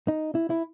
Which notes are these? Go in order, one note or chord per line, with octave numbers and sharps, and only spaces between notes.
D#4
E4
E4